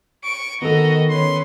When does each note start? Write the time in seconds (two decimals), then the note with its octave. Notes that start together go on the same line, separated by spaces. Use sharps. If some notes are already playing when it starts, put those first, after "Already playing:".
0.24 C#6 D7
0.62 D#3 B3 F#4 A4 D#5 A#5
1.09 C#4 B4 C6